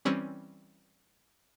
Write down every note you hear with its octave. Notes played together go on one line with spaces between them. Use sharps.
E3 G3 C4 C#4